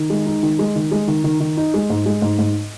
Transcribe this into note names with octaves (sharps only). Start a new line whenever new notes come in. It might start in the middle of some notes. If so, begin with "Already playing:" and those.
Already playing: D#3
G#3
D#4
D#3
G#3
D#3
G#3
D#3
D#3
D#3
D#4
G#3
G#2
G#3
G#2
G#2